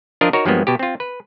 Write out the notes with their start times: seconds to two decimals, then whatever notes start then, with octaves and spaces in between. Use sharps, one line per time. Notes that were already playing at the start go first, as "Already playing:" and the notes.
0.21 F3 D4 F4 A#4 D#5
0.33 D#4 F#4 A#4 C#5
0.45 G2 F3 F#3 G#3 A#3 B3
0.67 B2 G4
0.79 C4 F4
1.00 B4